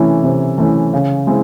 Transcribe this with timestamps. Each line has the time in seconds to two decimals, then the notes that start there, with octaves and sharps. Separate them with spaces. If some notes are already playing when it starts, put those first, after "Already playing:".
Already playing: C3 E3 A3 C#4 E4
0.23 C3
0.58 E3 A3 C#4 E4
0.93 C#3
1.27 G#3 C4 E4